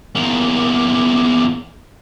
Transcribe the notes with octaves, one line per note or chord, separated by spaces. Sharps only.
E2 A#3